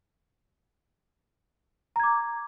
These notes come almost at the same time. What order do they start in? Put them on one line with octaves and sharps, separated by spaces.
A#5 G#6 D6